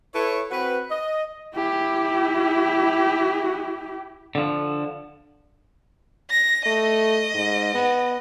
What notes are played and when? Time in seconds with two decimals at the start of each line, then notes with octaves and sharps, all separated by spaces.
0.14 E4 A4 B4 C#5
0.51 C4 F#4 B4
0.91 D#5
1.56 E4 G4
4.35 D3 F3
6.31 A#6
6.66 A3 D#5
7.34 G#2
7.74 B3